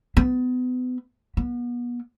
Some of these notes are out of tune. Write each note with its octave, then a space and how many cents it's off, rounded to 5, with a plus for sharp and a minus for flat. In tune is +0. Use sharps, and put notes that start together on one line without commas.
B3 +30
B3 -35